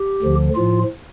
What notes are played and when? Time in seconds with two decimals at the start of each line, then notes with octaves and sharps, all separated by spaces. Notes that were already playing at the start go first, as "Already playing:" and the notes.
Already playing: G4
0.22 D2 D3 F3
0.55 A2 F3 F4